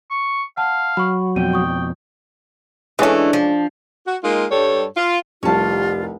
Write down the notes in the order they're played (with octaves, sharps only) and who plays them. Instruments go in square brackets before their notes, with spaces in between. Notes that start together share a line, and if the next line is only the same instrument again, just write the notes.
[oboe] C#6
[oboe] F5 [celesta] F#5 A5
[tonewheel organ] F#3 [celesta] B5 C#6
[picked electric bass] F2 B2 [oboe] G5 [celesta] D#7
[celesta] C#6 D#6
[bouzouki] E3 A3 [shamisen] G#3 C#4 [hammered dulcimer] D4
[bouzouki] F3
[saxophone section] F#4
G#3 A#3 D#4 F4
G2 G3 A4 C#5
F4
[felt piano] F1 C2 [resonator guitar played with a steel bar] C#4 A5 [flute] F4 [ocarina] G4